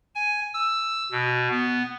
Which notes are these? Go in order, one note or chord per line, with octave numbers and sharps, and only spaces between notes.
G#5
E6
B2
B3